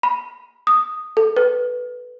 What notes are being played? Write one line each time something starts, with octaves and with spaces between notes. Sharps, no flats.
B5
D#6
A4
B4